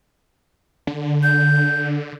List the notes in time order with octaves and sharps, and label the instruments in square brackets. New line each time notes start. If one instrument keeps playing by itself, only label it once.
[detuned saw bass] D3
[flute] G6